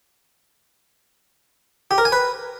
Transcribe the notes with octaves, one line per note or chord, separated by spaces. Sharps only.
G4
A#4
G#5
B4